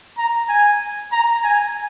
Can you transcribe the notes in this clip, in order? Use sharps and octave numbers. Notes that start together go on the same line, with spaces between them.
A#5
G#5
A#5
G#5